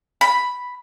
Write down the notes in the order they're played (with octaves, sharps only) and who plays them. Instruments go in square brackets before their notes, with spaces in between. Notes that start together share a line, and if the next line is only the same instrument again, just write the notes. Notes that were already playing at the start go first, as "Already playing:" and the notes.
[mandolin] B5